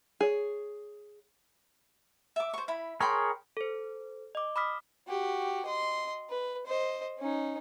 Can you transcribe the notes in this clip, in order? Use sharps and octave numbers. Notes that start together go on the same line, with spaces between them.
G#4 C#5
E5 D6
C5 C#6
E4 B5
G#4 A#4 C#5 G5 B5 C6
A4 C5
D#5 D6
B5 D6 D#6 F6 B6
F#4 G4
D#5 C6
B4
C5 D#5
C#4 D#4